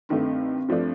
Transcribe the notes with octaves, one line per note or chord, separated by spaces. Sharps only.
G2 D#3 A3 C4
G2 F3 A3 D4